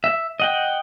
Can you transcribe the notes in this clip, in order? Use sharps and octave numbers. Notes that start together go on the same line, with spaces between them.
E5
D#5 F#5 G5